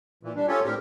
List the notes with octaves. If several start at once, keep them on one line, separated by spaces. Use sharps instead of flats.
A#2 E3
G3 D4
C#4 F4 G4 A4 C#5
A2 D3 C4 G4 A#4